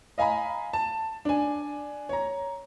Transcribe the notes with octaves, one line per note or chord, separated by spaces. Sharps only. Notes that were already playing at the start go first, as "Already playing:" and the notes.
D#5 F5 G#5 A#5 B5
A5
D4 G#5
C#5 A#5